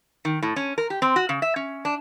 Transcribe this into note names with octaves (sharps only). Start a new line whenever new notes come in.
D#3
A2
C#4
A#4
G4
C4
F#4
C#3
E5
C#4
D4